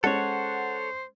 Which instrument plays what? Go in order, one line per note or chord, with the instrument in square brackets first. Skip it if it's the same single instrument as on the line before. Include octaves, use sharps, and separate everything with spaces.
[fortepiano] G#3 C#4 [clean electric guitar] A4 C#5 [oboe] C5 [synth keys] F#5